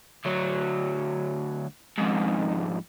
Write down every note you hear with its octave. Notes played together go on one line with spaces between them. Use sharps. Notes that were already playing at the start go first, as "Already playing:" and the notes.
D2 F#3
F2 G#2